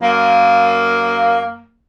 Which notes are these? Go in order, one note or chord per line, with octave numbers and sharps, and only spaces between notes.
F#2 A#3